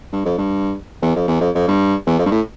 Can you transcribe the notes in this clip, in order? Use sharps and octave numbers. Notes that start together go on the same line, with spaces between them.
G2
F2
G2
E2
F2
E2
F2
F2
G2
E2
F2
G2
A2